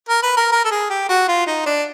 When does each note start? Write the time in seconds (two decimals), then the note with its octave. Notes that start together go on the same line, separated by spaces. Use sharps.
0.09 A#4
0.23 B4
0.37 A#4
0.52 A#4
0.65 A4
0.71 G#4
0.90 G4
1.09 F#4
1.28 F4
1.47 D#4
1.66 D4